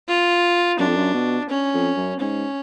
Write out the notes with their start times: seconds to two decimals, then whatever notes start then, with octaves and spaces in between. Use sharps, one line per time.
0.08 F4
0.79 F#2 D4
0.87 F2
0.96 F#2
1.14 B2
1.49 C#4
1.74 F2
1.96 F#2
2.20 G#2 C#4